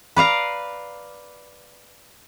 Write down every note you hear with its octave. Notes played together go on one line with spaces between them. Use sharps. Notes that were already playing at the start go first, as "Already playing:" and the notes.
B4 D5 F5 A#5